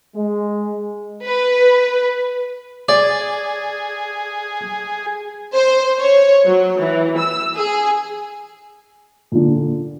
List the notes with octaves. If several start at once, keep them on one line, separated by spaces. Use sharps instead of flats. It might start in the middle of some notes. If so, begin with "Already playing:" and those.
G#3
B4
G#4 D5
C5
C#5
F#3
E3
E6
G#4
A#2 D3